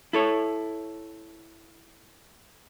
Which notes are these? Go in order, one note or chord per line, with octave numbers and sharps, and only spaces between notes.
E4 A4 C#5